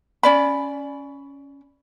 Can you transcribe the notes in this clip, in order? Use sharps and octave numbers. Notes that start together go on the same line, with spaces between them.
C#4 D5 B5